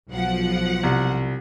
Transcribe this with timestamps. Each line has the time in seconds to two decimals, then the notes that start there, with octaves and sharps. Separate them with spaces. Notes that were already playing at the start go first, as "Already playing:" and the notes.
0.11 B1 F3 F#5
0.83 C2